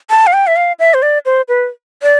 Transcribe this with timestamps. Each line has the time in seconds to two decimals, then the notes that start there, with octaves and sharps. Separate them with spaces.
0.10 A5
0.27 F5
0.33 G5
0.47 E5
0.56 F5
0.79 E5
0.94 C5
1.02 D5
1.25 C5
1.48 B4
2.03 D5